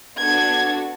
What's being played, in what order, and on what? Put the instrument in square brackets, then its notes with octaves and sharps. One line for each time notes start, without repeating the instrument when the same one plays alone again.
[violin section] B3 D4 F#4 A4 G#6